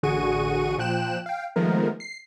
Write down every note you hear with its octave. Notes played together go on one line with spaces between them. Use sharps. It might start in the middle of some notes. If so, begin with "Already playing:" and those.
A1 D3 F#4 G#4 C#6 D#7
A#2 F3 G5 F#6 E7
F5 G5
D#3 F3 G#3 A3 B3 A#4
C7